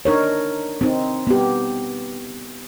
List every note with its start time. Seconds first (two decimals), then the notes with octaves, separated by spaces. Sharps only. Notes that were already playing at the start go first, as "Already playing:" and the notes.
0.05 D4 D#4 A#4 C#5
0.81 C4 D#4
1.27 B3 G4